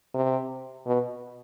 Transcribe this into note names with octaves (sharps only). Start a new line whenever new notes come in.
C3
B2